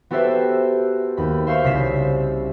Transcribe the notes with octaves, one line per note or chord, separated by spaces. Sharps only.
B3 F#4 G4 A4 C5 E5
D#2 B5
C5 E5 F5 C6 C#6
C2 C#3 B6 E7